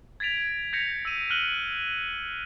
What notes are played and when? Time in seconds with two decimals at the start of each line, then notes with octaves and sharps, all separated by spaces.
0.20 G#6 A6 B6 D7 F7
0.73 G6 G#6 A#6 B6 C#7 F7
1.05 E6 D#7
1.30 F6 F#6 D#7 F#7 G7